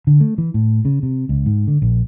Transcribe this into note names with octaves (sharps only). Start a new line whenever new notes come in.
D3
A3
E3
A2
C#3
C3
C#2
G#2
D3
A#1